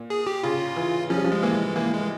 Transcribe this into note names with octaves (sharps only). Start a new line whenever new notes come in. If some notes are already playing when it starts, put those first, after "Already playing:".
Already playing: A#2
G#4
G4
C#3 F4
E3
F3 C#4
G3
F3
G#3
E3 A#3
G#3
E3 A#3
G#3